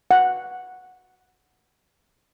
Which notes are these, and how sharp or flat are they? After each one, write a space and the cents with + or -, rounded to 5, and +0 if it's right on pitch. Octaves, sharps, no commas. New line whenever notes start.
F#5 -5